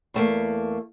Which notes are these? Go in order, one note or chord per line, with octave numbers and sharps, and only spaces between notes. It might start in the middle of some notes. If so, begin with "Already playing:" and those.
E2 A3 A#3